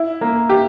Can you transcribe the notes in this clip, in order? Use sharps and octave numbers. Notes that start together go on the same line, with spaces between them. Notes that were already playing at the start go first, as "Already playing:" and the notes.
Already playing: E4
A#3
G4